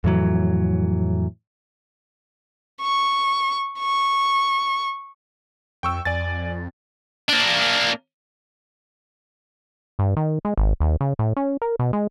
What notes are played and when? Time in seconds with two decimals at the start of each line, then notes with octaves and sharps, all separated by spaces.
0.04 F2 A2 E3 F#3
2.82 C#6
3.79 C#6
5.83 F2 G5 C#6 E6
6.05 F2 D5 G#5 A6
7.28 A#3 D4
9.99 G2
10.17 D#3
10.45 G#3
10.57 G#1
10.80 D#2
11.01 C#3
11.19 A2
11.37 C#4
11.62 A#4
11.79 B2
11.93 G#3